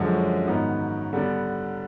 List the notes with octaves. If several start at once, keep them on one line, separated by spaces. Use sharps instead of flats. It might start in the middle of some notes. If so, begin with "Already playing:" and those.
Already playing: F#2 D3 F3 G#3 C#4
G#2 D#3 F#3 B3 D#4
D3 G3 B3 D4